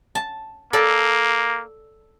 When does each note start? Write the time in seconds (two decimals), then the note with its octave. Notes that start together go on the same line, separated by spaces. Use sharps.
0.15 A5
0.73 A#3 A4 D5